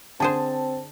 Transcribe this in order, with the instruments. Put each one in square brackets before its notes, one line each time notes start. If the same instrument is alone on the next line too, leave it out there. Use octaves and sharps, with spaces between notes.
[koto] D3 G#4 C5 [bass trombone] C4 [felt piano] A5